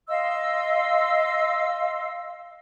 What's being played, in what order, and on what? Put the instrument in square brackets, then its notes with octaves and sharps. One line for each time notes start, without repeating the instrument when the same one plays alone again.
[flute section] D#5 F5 C6 E6